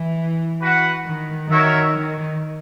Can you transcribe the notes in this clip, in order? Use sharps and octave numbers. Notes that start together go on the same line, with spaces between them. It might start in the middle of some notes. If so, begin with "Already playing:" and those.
Already playing: E3
F#4 B4 F#5
D#3
D#3 F#4 A#4 C#5 E5
D#3